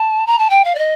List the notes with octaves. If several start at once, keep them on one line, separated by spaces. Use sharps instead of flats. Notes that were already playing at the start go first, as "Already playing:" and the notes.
Already playing: A5
A#5
A5
G5
F5
D5
D#5